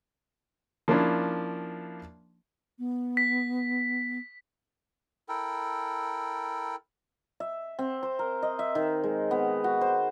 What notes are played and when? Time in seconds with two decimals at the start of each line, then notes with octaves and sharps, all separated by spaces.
0.88 F3 A#3 C#4 D4 E4
2.79 B3
3.17 B6
5.29 E4 A4 A#4 G5
7.40 E5
7.79 C4
8.03 C5
8.19 A#4
8.42 D#5
8.59 E5
8.75 D#3
9.04 G#3
9.31 B3
9.64 F#4
9.81 C5